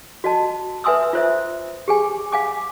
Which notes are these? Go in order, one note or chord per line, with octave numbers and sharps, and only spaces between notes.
F#4 D#5 A5
B4 E5 G#5 C6 D#6 E6
F4 C5 E5
G4 G#4 G#5
F5 G#5 D6